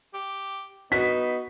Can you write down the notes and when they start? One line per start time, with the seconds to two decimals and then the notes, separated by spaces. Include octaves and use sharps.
0.14 G4
0.92 B3 D#4 F#4 B6